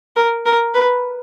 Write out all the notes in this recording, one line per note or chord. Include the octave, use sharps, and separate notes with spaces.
A#4
A#4
B4